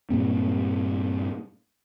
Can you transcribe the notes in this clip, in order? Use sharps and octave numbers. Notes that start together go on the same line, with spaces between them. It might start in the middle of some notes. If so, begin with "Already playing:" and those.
G2 A#2 A#3 C4